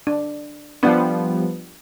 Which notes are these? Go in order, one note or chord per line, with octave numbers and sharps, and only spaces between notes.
D4
F3 G3 B3 D4 F#5